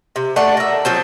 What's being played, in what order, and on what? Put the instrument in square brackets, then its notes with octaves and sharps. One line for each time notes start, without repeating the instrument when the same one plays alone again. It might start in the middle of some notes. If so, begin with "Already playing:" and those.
[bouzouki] C3
A3 D4 D5 F#5
A#4 E5
F3 F#3 C4